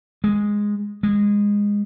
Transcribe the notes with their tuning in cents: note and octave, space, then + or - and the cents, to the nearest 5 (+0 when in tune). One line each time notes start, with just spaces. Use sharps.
G#3 -5
G#3 -20